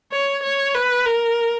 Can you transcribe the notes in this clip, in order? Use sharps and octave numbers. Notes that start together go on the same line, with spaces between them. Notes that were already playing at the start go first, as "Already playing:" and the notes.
C#5
C#5
B4
A#4